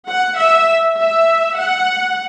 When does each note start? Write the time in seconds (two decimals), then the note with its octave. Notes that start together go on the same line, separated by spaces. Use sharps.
0.09 F#5
0.37 E5
0.97 E5
1.55 F#5